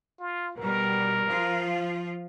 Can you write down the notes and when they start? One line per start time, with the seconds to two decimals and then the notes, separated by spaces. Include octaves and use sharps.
0.20 F4
0.58 B2 G3 A#4
1.28 F3 F4